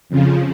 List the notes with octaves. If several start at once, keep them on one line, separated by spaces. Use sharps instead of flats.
F2 C#3 F3